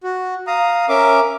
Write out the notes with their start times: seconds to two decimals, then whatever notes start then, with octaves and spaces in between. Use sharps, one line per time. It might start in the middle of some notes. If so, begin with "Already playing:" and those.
0.03 F#4
0.47 F5 A#5 D#6
0.89 C#4 A#4 E5 D6